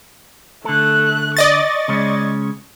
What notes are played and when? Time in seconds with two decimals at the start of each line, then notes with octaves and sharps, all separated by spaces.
0.65 D3 A3 A4 F#6
1.37 D5 D#5 C#6 A6
1.88 C#3 G#3 C#4